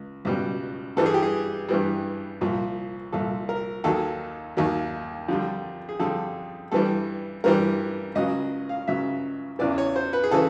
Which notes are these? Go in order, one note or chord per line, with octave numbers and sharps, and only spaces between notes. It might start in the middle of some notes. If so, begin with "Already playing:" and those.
Already playing: C#2
C#2 B2 G3
G2 E3 G3 A4
G#4
G4
G#4
G2 E3 G3
C2 A#2 F3
C2 A#2 F3 A4
A#4
D#2 D#3 F#3 A4
D#2 D#3 F#3
F2 D3 G3
G#4
F2 D3 G3 A4
G2 E3 G3 A4
G2 E3 G3 A#4
C#2 C#3 F#3 D#5
F5
C#2 C#3 F#3 E5
E2 C#3 E3 D5
C#5
C5
B4
G#4
C#3 E3 A4